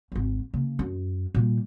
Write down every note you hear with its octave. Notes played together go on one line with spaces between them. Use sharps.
G#1 D2
C#3 A#3
F#2
A#2 G3